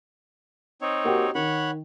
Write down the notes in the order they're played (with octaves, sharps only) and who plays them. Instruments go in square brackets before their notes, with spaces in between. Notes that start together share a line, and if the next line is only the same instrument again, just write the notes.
[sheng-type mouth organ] C4 D#4 C#5
[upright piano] A#3 F#4 G4
[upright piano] D#3 [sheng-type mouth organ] C#5 F#5 B5